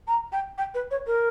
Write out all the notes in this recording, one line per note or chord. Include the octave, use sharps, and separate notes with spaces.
A#5
G5
G5
B4
C#5
A#4